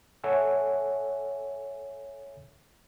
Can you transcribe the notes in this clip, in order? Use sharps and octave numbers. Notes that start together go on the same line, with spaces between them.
A4 C#5 E5 F#5 G#5